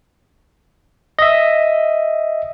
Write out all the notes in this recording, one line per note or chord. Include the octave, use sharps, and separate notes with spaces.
D#5 E5